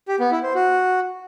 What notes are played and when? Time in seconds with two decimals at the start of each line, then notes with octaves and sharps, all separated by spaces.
0.08 G4
0.20 B3
0.31 E4
0.43 C5
0.55 F#4